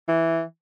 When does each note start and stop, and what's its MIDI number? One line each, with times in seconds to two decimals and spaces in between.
0.08 0.42 52